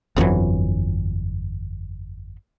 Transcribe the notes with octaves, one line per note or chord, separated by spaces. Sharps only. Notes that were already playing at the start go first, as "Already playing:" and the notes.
G1 F2 E3 F#3